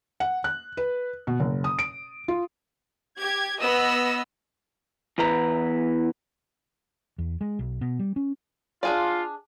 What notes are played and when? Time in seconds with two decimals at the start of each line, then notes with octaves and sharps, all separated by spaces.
0.20 F#5
0.44 F#6
0.77 B4
1.27 B2
1.40 F#1
1.64 D#6
1.79 D7
2.28 F4
3.18 G4 G#6
3.59 B3 D#5 E6
5.18 E2 E3 B4 A#5
7.18 E2
7.41 G#3
7.59 B1
7.81 B2
7.99 G3
8.16 C#4
8.83 D4 F4 G#4 D5